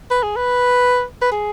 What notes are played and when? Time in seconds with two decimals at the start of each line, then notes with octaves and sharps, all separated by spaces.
0.11 B4
0.23 G#4
0.36 B4
1.22 B4
1.32 G#4